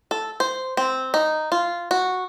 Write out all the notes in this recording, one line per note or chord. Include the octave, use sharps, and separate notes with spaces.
A4
C5
C4
D#4
F4
F#4